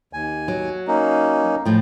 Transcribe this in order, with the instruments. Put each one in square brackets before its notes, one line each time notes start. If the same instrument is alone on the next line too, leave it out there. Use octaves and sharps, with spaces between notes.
[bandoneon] D#2 G#5
[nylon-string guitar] F#3
[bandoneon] A#3 C#4 D#4
[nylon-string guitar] A2 F3 [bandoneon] G5